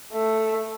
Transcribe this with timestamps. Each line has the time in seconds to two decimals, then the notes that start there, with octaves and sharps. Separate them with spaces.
0.12 A3